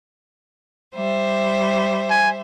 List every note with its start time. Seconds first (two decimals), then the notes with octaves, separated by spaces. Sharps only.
0.94 G3 C5 E5
2.10 G#5